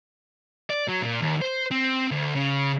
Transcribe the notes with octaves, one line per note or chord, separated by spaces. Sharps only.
D5
F#3
A#2
D#2
C5
C4
D2
C#3